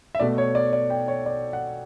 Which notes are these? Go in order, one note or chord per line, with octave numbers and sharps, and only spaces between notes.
E5
B2 A3 D5
C#5
D5
D5
G5
C#5
D5
F#5